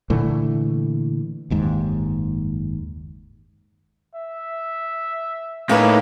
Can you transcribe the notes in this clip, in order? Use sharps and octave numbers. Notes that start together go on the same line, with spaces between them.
A#2 D3 E3 A3
F#1 D#2 G#2
E5
A2 A#3 C#4 D#4 B4